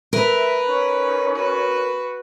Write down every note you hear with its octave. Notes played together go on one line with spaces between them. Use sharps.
A#4 B4 E5
C#4 D#4
F#4 B4